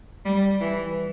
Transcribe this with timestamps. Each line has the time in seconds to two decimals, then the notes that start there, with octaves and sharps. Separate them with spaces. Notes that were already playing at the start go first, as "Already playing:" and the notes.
0.25 G3
0.59 E3